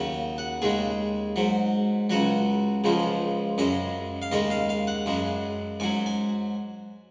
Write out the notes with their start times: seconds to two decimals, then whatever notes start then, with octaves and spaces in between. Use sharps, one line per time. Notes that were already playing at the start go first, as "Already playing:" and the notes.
Already playing: D#2 C#3 F#3
0.38 F#5
0.62 D#2 C#3 G#3 G#4
1.36 G#2 F#3
2.10 C#2 C#3 F#3 F#4
2.84 C#2 C#3 F3 G#3
3.58 F#2 C#3 G#3 D#5
4.22 F5
4.32 D#2 C#3 G#3 D#5
4.50 F5
4.69 F5
4.87 F#5
5.06 F#2 C#3 G#3
5.80 G#2 F#3 G#5
6.06 G#5